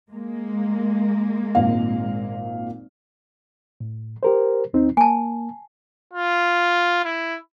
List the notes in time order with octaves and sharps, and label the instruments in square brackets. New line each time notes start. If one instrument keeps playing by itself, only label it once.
[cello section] G#3 A#3
[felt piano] G#1 A#2 F5
[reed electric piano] A2
G4 A#4 C5
D2 C4 D#4
[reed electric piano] A#3 [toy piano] G#5 A5
[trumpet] F4
E4